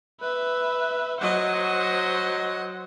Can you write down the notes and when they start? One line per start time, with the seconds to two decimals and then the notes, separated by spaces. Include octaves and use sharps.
0.21 B4 E5
1.21 F#3 C5 D#5 F#5